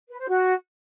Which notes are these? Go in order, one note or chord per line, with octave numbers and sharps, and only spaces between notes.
B4
C5
F#4